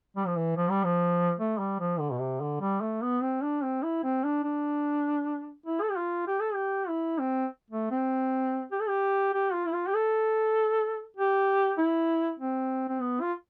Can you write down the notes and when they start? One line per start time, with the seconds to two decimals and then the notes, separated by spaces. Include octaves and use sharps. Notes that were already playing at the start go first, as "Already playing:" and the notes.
0.17 G3
0.26 F3
0.36 E3
0.57 F3
0.70 G3
0.84 F3
1.39 A3
1.58 G3
1.80 F3
2.00 D3
2.12 B2
2.20 C3
2.41 D3
2.61 G3
2.81 A3
3.02 B3
3.22 C4
3.42 D4
3.63 C4
3.83 E4
4.04 C4
4.24 D4
4.44 D4
5.66 E4
5.82 A4
5.90 G4
5.97 F4
6.27 G4
6.40 A4
6.54 G4
6.89 E4
7.19 C4
7.71 A3
7.91 C4
8.72 G4
8.81 A4
8.88 G4
9.34 G4
9.53 F4
9.66 E4
9.74 F4
9.87 G4
9.95 A4
11.17 G4
11.78 E4
12.40 C4
12.89 C4
13.00 B3
13.21 F4